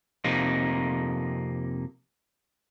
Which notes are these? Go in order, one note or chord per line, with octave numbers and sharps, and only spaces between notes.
F2 C3 A#3 D#4